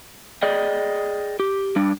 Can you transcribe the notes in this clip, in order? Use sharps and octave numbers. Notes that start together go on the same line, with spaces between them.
G#4 D5 D#5 G5
G4
G3 D4